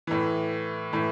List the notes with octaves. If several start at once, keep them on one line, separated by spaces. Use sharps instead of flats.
A2 E3
A2 E3